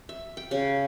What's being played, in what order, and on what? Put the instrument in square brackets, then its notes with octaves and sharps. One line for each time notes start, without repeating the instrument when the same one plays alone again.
[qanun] E5
G5
C#3